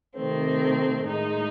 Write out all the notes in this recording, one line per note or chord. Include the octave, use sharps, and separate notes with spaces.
C3 D#3 A3 C4
A2 G#3 D#4